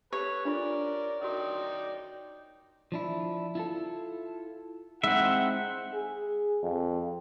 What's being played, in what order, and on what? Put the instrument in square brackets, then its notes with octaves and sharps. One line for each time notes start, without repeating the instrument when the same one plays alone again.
[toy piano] G4 [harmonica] A4 B4 [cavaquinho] C#5
[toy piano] D4 F4 C#6 [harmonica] A#4 D5
[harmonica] D#4 D5 G5 [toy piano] F#4 A#4
[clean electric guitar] F3 D4 E4
E4 F4 A4
[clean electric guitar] G#3 D#4 E4 [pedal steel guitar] C4 E5 [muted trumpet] F#5
[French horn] G#4
F2